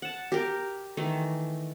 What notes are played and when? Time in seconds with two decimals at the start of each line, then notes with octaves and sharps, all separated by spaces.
0.02 F#5 A5
0.32 G4 A#4
0.97 D#3 E3 A3